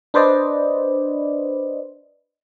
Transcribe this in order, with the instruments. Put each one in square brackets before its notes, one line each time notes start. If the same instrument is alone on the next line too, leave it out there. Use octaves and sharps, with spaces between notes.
[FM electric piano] D4 B4 C5 D5 D#5